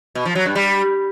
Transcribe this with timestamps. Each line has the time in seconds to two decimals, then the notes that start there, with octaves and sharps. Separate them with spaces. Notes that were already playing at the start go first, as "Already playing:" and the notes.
0.15 B2
0.25 F3
0.35 F#3
0.45 G2
0.55 G3